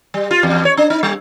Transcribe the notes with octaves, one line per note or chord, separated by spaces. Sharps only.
G3
F4
E2
C#5
D4
D#4
G3